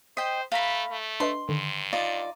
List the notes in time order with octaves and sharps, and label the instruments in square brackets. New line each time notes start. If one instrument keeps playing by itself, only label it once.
[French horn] C5 [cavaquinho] D#5 G5 [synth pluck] B6
[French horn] A3 [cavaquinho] F5 A#5 B5
[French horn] A3
[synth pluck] D4 B4 D#5 [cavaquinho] C6
[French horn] G2 [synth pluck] D3 D#3
[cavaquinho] D#4 F4 D5